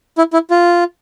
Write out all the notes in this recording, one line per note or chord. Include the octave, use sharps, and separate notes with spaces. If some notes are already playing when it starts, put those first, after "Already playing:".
E4
E4
F4